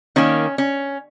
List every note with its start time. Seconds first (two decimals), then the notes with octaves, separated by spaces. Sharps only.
0.16 D#3 A#3 C#4
0.58 C#4